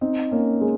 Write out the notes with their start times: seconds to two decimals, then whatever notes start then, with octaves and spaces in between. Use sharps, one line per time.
0.01 C4 D#4
0.31 A#3 C#4
0.61 G#3